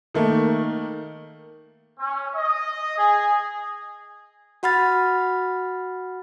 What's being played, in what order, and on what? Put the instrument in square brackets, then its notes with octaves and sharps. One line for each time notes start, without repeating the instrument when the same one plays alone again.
[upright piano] D#3 A3 A#3
[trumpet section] C#4
D#5
G#4
[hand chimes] F#4 F#5 B5 F6 A6